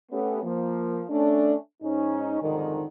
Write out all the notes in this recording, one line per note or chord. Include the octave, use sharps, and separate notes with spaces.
A3 B3 C#4 G4
F3 A#3
A3 C#4 D4
G#2 C#4 D#4
C2 F2 G#2 D3 D#3